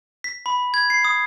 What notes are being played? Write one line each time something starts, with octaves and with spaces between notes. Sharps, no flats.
B6
B5
G#6
C7
D#6